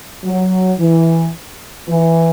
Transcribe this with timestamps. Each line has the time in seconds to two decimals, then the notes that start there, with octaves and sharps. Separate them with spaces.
0.24 F#3
0.80 E3
1.89 E3